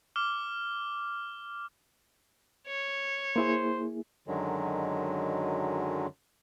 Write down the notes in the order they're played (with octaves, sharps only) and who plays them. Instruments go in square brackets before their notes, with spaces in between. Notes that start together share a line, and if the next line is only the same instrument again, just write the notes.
[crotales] D6 F6 G7
[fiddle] C#5
[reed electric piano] A#3 E4 G#4 [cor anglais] C5
[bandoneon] F#2 D3 D#3 F#3 G#3